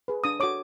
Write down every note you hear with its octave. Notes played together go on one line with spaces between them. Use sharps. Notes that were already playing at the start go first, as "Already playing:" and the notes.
G#4 B4
D4 D#6
F#4 A4 C#5 D6